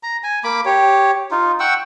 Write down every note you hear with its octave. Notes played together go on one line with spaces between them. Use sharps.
A#5
G#5
A#3 B5 D6
G4 C#5
D#4 F4
F#5 G5 C#6 E6